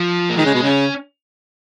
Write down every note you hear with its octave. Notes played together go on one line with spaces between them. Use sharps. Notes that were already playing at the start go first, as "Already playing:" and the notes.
Already playing: F3
A#3
D#3 G#3
C#3
B2
C#3 C#4